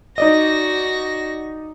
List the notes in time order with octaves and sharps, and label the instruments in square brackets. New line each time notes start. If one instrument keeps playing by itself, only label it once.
[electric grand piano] D#4 D5 D#5 [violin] F#4 A#6